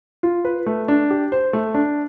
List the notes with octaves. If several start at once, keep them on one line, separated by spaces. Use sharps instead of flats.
F4
B4
A3
D4
G4
C5
A3
D4